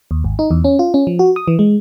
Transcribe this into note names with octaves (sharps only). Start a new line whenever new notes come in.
D#2
G#1
D#4
E2
C#4
F4
C#4
F3
F#4
D#6
E3
G#3